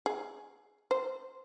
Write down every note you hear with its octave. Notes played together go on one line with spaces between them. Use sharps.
G#4
C5